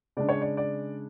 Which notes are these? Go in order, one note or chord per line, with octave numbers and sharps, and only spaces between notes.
C#3 G#3 D4 D5
C#5
D5
D5